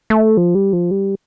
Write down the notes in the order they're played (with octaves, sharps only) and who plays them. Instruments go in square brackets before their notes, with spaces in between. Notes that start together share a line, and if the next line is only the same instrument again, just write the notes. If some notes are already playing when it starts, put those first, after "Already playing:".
[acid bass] A3
F3
G3
F3
G3